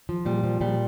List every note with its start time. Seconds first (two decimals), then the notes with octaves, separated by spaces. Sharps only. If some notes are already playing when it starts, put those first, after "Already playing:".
0.09 F3
0.25 A#2 G3
0.44 F3
0.61 A#2 G3